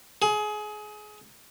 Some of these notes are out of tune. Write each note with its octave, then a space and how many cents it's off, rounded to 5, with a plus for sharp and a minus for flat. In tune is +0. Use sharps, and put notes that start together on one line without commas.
G#4 +25